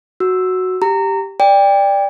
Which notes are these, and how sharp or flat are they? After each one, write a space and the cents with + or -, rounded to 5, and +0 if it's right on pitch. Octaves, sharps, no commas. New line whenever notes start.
F#4 +0 E6 +0
G4 +0 A#5 -20
D5 +0 G5 +25